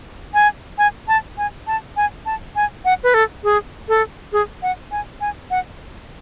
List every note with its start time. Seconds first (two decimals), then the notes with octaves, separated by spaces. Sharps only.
0.34 G#5
0.78 G#5
1.08 A5
1.38 G#5
1.67 A5
1.97 G#5
2.26 A5
2.56 G#5
2.85 F#5
3.04 B4
3.14 A4
3.44 G#4
3.89 A4
4.33 G#4
4.62 F#5
4.91 G#5
5.21 G#5
5.51 F#5